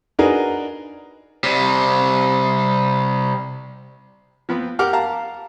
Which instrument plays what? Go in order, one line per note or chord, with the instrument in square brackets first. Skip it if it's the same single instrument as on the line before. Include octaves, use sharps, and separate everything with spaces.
[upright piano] D4 D#4 F#4 G#4 A#4 B4
[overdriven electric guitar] C3 G3
[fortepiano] F3 B3 C4
G4 A#4 F#5 D6 F6
F5 A5 A#5